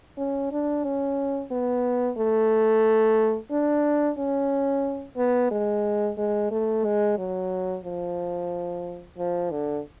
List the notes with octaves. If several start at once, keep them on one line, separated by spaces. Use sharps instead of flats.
C#4
D4
C#4
B3
A3
D4
C#4
B3
G#3
G#3
A3
G#3
F#3
F3
F3
D3